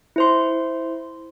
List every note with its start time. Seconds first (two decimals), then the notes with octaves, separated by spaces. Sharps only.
0.16 E4 C5 C6